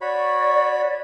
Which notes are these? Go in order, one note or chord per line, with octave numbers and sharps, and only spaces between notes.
F#4 C#5 D5 B5